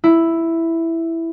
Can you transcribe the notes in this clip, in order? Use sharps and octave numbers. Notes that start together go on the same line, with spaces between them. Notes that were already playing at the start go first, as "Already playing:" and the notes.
E4